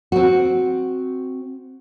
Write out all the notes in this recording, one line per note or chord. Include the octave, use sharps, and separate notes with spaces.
C4 F#4